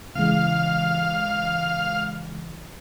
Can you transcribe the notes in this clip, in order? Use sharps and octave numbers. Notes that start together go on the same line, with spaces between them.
C#3 E3 G#3 F5